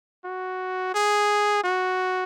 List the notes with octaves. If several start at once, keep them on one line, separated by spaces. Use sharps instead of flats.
F#4
G#4
F#4